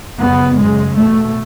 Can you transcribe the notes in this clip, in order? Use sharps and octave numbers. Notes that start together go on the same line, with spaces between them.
F#2 C#3 B3
F#2 C#3 G#3
E2 B2 A3